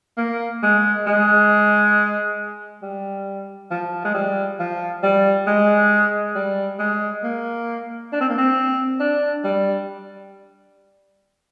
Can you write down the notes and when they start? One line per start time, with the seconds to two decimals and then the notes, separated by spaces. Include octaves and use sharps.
0.17 A#3
0.63 G#3
1.07 G#3
2.82 G3
3.71 F3
4.05 G#3
4.14 G3
4.60 F3
5.03 G3
5.47 G#3
6.35 G3
6.79 G#3
7.23 A#3
8.13 D4
8.20 C4
8.29 A#3
8.38 C4
9.00 D4
9.44 G3